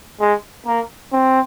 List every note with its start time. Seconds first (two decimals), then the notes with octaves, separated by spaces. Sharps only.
0.20 G#3
0.66 A#3
1.13 C4